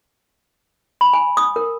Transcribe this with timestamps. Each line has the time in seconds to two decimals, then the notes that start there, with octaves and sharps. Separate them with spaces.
1.01 B5
1.13 G#5
1.37 D#6
1.56 A#4